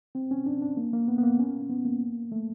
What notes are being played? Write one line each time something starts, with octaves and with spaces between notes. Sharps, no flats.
C4
C#4
D4
D4
A#3
A#3
B3
B3
A#3
C#4
B3
A#3
A3